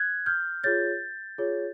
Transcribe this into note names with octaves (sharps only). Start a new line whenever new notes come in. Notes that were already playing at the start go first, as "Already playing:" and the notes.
Already playing: F#6 G#6
F6 G6
F4 G#4 C#5 G6 A6
F4 G#4 C#5